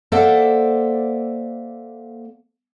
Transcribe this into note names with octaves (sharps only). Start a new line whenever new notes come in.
A#3 A4 C5 D5 E5 F#5